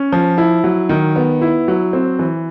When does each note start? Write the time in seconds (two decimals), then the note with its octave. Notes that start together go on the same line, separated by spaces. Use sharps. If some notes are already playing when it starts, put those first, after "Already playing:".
Already playing: C#4
0.12 F3
0.38 E4
0.64 F#3
0.89 D#3
1.16 B3
1.41 E4
1.68 F#3
1.93 C4
2.19 E3